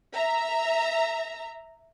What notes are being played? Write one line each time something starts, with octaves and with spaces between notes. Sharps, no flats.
E5 A#5